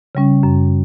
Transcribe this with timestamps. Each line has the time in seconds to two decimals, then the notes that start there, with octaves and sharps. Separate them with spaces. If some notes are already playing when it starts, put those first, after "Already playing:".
0.15 C#3 G3 C#4
0.43 F#2